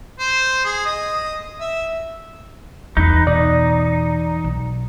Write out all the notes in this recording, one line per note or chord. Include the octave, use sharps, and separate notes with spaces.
C5
G#4
D#5
E5
E2 D#4 B4
B2 D#4 D5
B1